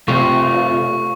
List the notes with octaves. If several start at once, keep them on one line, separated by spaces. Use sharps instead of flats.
C3 A3 F4 C#6